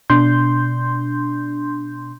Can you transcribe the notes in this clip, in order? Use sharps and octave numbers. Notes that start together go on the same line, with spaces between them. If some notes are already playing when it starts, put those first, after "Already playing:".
B2 D4 C6 G6